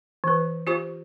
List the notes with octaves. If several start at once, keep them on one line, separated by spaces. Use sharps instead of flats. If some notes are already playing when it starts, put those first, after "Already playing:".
E3 B4
F4 G4 C5 C#6